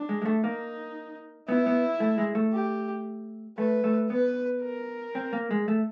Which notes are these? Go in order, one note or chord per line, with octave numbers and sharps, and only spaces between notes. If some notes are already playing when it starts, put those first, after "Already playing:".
Already playing: D4
G#3
G#3
A3
A#3 D#4
B3 E4
B3
A3
G#3
A3
G4
A3 B4
A3
B3 B4
A#4
C4
A#3
G#3
A3